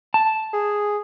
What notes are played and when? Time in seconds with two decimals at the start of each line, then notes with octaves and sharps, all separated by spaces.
0.14 A5
0.53 G#4